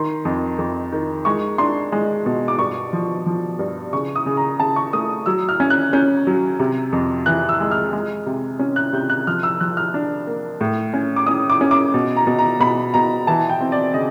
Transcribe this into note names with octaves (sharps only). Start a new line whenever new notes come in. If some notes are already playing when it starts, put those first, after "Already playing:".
Already playing: D#3 C6
F2
F2
D#3
G#3 C#6
D4 C6
G#3
B2
D6
G2 C#6
F3
F3
G2
C#3 C#6
D#6
C#3
A#5
C#3 A5
C#6
A3 D#6
F#3 E6
F6
C#4
F#6
C#4 G6
F#3
C3
F2
E3 F#6
E6
G#3
F6
G#3
C3
C#4
F#6
C3 G6
F#6
F3 F6
E6
F3 F#6
F6
D4
A#3
A2
C#4
D6
C#4 D#6
D6
C#4
D6
B2
A#5
B2
A#5
B2 B5
B2 A#5
E3 A5
G5
C4
D5
C#3 D#5